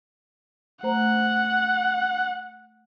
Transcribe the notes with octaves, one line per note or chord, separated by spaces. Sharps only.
A3 C5 F#5 A#5